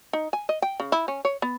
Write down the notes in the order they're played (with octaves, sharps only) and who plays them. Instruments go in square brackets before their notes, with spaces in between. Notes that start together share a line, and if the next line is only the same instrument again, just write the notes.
[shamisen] D#4
G#5
D#5
G5
C#3
E4
C#4
C#5
B3